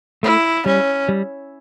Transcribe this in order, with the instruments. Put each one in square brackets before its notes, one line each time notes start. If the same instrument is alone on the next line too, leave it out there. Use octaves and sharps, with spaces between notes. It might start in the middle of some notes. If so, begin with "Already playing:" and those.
[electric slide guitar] A3 [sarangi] E4
[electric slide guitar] G3 [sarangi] C#4
[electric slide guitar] G3